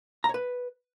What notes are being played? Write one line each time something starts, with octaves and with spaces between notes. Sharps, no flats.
A#5
C#5
B4